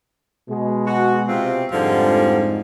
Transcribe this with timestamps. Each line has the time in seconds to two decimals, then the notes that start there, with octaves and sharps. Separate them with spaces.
0.49 B2 G#3
0.86 F#4
1.27 C3 C4 F4
1.72 F2 G#2 D3 F3 G3